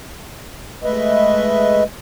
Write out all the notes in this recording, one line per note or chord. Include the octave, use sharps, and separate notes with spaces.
G#3 A3 B4 D#5 E5